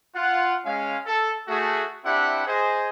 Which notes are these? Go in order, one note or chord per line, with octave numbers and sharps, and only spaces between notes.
F4 F#5
G#3 C#4 F5
A4
A3 F#4 G#4
C4 D4 E4 G4 E5 F#5
G#4 C5 D#5